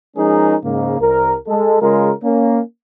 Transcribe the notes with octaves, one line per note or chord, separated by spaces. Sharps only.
F3 G#3 C#4 D#4 G#4 A#4
G#2 C#3 A#3
C2 A#4
G#3 A4
C#3 G#3 F4 A#4
A#3 C#4